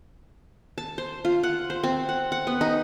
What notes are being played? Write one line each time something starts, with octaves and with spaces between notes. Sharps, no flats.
A5
C5
F4
F#5
C5
C4
F#5
F#5
B3
D#4